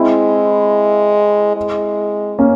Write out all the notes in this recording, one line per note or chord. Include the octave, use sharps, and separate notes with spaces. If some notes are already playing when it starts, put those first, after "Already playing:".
Already playing: G#3 C4 E4
G#3
A#3 C#4